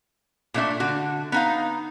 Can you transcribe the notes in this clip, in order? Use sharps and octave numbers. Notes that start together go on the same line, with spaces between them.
A#2 A3 D4 E5
D3 F#4
B3 D#4 F5